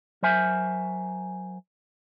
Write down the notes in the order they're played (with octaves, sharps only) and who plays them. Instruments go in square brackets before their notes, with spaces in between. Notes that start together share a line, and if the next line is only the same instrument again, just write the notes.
[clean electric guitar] F#3 A#4 C5 E5 G#5